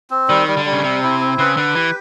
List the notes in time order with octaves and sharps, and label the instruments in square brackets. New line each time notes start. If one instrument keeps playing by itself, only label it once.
[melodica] C4
[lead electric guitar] D#3 [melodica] G3
[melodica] G3
[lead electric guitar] D3
[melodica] G3
[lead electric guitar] C#3
[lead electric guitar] C3 [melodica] C4
[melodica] E4
C4
[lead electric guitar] C#3 [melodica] B4
[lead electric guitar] D3 [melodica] B4
[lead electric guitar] E3 [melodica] G4